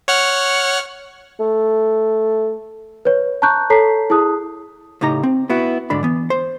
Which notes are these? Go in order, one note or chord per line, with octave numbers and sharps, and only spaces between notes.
C#5 F#5 F6
A3
B4 C#5
A5 A#5 C#6 F#6 G6
A4 C#5 A5 A#5 B6 C7
E4 G#4 A5 D#6 F#6
A2 C#3 D#4 G4 A#5
C4
B3 E4 F#4
D2 G#2 D3 D4 B5
E3 B3
C5